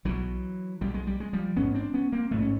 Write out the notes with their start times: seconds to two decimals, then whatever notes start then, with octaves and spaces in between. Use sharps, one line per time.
0.05 B1 B2 E3 F#3
0.81 B1 B2 G3
0.94 G#3
1.07 G3
1.20 G#3
1.33 F3 G3
1.56 A1 G#2 B3 C#4
1.74 C4 D4
1.94 B3 C#4
2.12 A#3 C4
2.31 A1 G#2 A3 B3
2.42 C#4